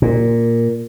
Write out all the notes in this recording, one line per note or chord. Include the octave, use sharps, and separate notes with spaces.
A#2